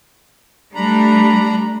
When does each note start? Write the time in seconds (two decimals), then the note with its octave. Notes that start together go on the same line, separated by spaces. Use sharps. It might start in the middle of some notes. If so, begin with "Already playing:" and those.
0.75 G3 A3 D4 A#5 B5